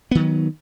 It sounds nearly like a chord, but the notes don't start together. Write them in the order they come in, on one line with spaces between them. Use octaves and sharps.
B3 D#3 F#3